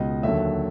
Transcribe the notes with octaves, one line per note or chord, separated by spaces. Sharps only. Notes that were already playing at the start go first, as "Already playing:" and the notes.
Already playing: C#2 B2 D#5
D#2 D3 F#3 E5